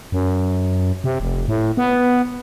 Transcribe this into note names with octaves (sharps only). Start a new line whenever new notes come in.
F#2
C3
F1
A2
B3